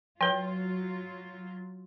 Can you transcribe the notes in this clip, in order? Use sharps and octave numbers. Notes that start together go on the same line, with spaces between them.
F3 F#3 F4 B4 G5